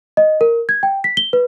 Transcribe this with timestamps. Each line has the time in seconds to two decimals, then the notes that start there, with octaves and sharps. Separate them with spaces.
0.17 D#5
0.41 A#4
0.69 G#6
0.83 G5
1.04 B6
1.17 G7
1.33 B4